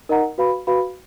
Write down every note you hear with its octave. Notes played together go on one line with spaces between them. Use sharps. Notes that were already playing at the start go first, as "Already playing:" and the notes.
D#4 A#4 D#5 F#5 A#5
F#4 B4 F5 B5
F#4 B4 F5 B5